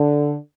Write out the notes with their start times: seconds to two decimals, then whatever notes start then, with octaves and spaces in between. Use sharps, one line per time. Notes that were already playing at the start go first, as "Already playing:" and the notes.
Already playing: D3